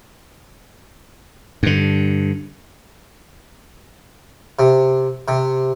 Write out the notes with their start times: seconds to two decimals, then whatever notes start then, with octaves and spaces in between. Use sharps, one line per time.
1.63 G2 D3
4.59 C3
5.28 C3